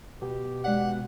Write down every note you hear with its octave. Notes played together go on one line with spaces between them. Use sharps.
B2 G4
G#3 D5 F#5 F#6